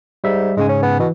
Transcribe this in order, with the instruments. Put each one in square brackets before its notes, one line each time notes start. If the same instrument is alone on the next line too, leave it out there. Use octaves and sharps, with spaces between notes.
[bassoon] G#2 [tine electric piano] G3 E5
[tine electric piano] G#2 C#3 G#5 [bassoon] G#3
[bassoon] C#4
B3
[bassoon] B2 [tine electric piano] E3